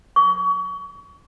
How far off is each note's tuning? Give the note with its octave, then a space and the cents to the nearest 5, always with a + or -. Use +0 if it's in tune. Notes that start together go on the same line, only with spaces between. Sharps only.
C#6 +30